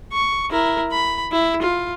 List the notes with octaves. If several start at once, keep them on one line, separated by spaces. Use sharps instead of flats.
C#6
E4 A#4
B5
E4
F4